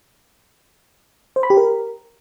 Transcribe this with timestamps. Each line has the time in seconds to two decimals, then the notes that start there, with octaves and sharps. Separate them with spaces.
1.36 C5
1.43 B5
1.50 G4
1.57 A#4